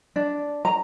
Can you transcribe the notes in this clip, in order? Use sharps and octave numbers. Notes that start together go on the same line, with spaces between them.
D4
A#5